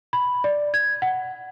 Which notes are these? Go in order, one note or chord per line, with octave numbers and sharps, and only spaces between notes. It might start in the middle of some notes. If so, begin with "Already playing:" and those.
B5
D5
G#6
F#5